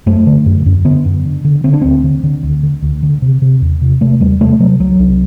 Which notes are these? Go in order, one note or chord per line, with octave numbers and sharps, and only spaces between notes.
F#2 A3
D3
F#2
F#2
D3 B3
F#2
D3
D3
D3 C4
D4
D2 C4
D3
D3
D2
D3
D2
D3
C3
C3
E2
C3
C3 A3
E2 G3
C3 A3
C3 F#3
C2 F#3
C2